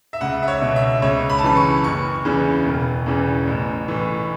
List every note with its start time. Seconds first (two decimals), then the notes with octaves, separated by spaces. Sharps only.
0.13 E5
0.21 C#2 F#5
0.43 E5
0.48 C#5
0.62 B2
0.76 E5
1.02 C#2 C#5
1.30 B5
1.39 A5
1.44 C#3 E3 B5
1.57 C#6
1.84 F#1 C#6
2.25 E2 C#3 E3
2.65 E1
3.06 E2 C#3 E3
3.47 A1
3.88 A2 E3